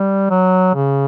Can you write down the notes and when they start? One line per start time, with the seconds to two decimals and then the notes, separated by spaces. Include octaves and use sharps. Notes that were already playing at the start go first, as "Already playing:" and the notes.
Already playing: G3
0.30 F#3
0.75 C#3